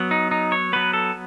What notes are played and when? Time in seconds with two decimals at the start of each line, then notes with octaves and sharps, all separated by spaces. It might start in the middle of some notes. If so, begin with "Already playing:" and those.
Already playing: F#3 B3
0.11 D#4
0.31 D#4
0.52 C#5
0.73 F#3 B3 B4
0.93 A4